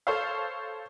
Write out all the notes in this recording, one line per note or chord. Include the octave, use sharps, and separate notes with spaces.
A4 C5 C#5 F5